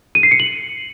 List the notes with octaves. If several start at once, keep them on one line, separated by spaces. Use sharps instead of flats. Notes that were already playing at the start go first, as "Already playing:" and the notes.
D#7
C7
C#7
F#7